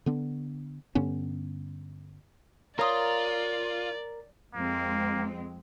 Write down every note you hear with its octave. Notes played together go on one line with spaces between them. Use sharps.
D3 B3 D4
G2 D3 B3 C#4
F4 A#4 C#5 D5 A#5 C6 D#6
F2 G#3 A#3 C4